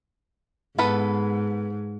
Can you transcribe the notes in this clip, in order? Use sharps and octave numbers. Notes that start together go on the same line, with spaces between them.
G#2 B3 A4 B4